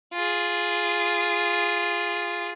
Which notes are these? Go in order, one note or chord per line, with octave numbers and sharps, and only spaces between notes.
F4 G#4